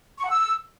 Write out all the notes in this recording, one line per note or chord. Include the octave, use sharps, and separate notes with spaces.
C#6
F#5
E6